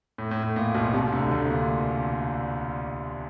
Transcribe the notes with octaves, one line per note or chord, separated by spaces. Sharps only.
A2
A2
A2
A#2
B1 B2
C2 C3
D2 D3
D2 D3
A#2